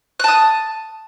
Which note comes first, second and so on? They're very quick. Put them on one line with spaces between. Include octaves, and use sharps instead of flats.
F#6 A5 D#6